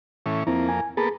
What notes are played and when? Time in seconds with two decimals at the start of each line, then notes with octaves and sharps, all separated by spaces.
0.26 A2 E3 C#4
0.47 F2 A#3 C4 E4
0.69 G#5
0.97 A#3 B3 G#4 A4